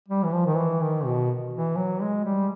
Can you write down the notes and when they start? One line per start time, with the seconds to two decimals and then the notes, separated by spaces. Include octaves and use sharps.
0.08 G3
0.24 E3
0.33 F3
0.46 D#3
0.56 E3
0.81 D#3
1.05 B2
1.53 E3
1.77 F#3
2.02 G#3
2.25 G3